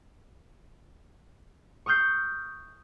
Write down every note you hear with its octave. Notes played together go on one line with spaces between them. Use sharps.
C#6 D#6 F6 G6 C7